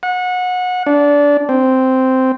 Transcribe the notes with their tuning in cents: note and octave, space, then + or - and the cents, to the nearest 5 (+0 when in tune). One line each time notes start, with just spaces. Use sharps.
F#5 -25
D4 -20
C4 -5